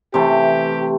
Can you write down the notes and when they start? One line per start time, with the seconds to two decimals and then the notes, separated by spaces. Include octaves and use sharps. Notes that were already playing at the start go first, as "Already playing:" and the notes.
0.14 C3 E3 A3 G4